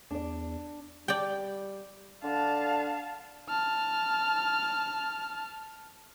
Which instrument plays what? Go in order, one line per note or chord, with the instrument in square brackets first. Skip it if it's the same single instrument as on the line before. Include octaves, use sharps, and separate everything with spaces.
[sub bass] E2 [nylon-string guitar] D4 D5
[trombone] G3 [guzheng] D5 G5
[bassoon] D3 [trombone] D4 [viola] F5 A5
[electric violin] A5 F6